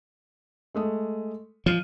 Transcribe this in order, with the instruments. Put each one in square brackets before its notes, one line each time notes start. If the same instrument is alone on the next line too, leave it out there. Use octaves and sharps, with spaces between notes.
[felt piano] G#3 A3 D#6
[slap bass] F3 [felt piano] F6 D#7